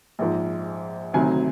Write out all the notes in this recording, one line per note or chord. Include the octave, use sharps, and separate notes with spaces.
A#1 G#2 F3
D2 C3 D#3 F#3 G#5